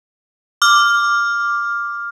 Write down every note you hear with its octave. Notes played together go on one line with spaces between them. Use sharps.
D6 F6